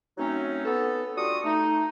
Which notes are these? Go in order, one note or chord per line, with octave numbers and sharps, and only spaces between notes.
F#2 F#3 A3 C4 C#4 D#4
B3 A4
G3 D4 F4 F#4 C#6 D#6
A3 D#4